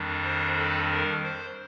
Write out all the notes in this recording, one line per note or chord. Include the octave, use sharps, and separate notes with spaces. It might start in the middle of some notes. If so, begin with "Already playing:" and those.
Already playing: F2 D#3 G3 D4
C5
A4
A#4
C5